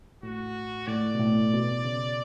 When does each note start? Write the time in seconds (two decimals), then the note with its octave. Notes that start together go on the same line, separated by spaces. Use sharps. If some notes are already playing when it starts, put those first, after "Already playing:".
0.23 A2 F#4
0.88 A2 D5
1.15 B2
1.20 A2
1.53 B2
1.85 C#3